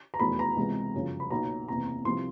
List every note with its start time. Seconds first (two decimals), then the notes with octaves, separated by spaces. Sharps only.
0.14 A#5
0.20 F1 E2 B2 F#3 B5
0.39 A#5
0.57 C#2 C3 E3 G#3 B3
0.94 G1 F#2 C#3 F3
1.20 B5
1.30 B1 A#2 F#3 B3 A#5
1.68 F#1 E2 C3 A#5
2.05 C2 C3 F3 C6